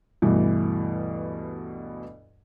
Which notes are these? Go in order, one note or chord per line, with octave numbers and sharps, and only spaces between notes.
D2 G2 B2 E3